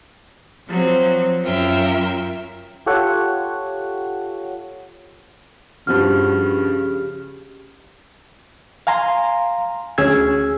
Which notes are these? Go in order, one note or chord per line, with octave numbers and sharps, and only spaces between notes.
F3 F#3 C4
F#2 C#4 F4 A#4 E5 G5
F4 G4 A4 C#5 F#5
G2 C#3 F3 F#4 G4 F6
F5 G#5 A#5 C6
D2 C#4 G#4 E6 G#6